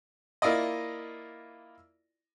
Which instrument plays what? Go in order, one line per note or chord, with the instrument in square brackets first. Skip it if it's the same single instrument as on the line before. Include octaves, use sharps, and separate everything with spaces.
[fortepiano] A#3 E4 F4 D5 D#5